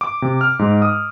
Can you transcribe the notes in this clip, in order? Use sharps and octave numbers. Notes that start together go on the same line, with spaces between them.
D6
C3
F6
G#2
D#6